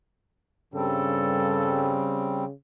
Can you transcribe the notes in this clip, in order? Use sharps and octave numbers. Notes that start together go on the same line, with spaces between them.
G2 C#3 G3 C4 A4